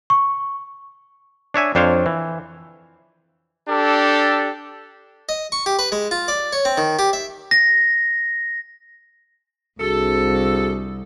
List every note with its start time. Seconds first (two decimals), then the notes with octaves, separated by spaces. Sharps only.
0.10 C#6
1.54 D4 C#5 E5 G#5
1.75 F2 D4 C5 C#5 F5
2.06 E3
3.69 D4 G4 A4
5.29 D#5
5.52 C#6
5.66 G4
5.79 B4
5.92 G#3
6.11 F4
6.28 D5
6.53 C#5
6.65 C4
6.78 D#3
6.99 G4
7.13 E5
7.51 A#6
9.80 C2 D4 F#4 G#4 A4